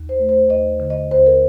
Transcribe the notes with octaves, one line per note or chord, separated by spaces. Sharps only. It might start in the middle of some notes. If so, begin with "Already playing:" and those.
Already playing: D#2
C5
A3
C5
D#2 D#5
D3
D#5
D#2 C5
A#4